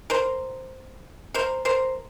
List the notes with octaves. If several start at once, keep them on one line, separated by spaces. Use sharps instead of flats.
A#4 C5
A#4 C5
A#4 C5